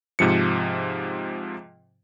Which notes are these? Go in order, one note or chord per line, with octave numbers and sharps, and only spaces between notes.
G#2 C3 F3 C#7